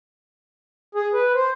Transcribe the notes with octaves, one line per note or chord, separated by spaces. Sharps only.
G#4
B4
C5